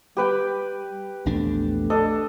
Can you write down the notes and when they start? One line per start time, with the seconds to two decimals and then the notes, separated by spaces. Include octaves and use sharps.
0.17 G3 G4 B4 G5
1.26 A#1 E2 A3 D4
1.90 D4 A4 D#5